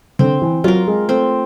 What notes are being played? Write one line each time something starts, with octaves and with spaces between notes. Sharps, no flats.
D3 C4
E3
F#3 F4 A#4
G#3
A3 C4